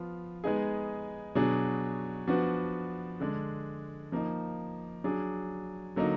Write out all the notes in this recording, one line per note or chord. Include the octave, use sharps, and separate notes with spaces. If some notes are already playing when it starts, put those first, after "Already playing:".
Already playing: F3 B3 F4
G#3 B3 D#4 G#4
B2 F#3 D4 G#4
F3 B3 D4 F#4
D3 G#3 D4
F3 A#3 D#4
F#3 D4 G#4
D3 F#3 A#3 D#4